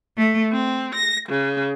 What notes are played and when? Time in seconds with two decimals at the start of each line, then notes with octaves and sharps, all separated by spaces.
0.17 A3
0.52 C4
0.94 A#6
1.29 C#3